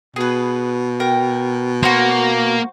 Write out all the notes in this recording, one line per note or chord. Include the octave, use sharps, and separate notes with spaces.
B2 G#4 B4
A#4 G5
A#3 F#4 C5